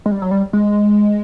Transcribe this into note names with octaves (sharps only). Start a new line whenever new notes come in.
G#3
G3
F#3
G3
G#3